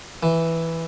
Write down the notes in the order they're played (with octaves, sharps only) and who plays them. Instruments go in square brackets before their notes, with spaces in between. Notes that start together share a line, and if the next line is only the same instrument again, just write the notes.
[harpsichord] E3